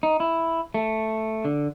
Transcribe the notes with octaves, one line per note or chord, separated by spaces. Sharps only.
D#4
E4
A3
D3